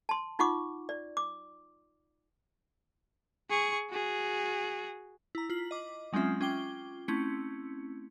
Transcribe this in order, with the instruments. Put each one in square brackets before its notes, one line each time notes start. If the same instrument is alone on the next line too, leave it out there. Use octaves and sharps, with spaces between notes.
[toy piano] A5 C6
D#4 F4 F#5 C#6 D6
D5
D6
[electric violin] G#4 C#6
F#4 G#4
[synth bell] E4 A#5
F4 B6 F#7
D#5 D6
F#3 G#3 C4 C#4 F4 E5
C#4 F4 G5 D6 G7
A3 C4 C#4 E4 C#7